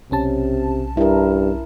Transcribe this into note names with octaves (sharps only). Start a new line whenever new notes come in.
B1 C3 C#4 A5
G2 E4 A#4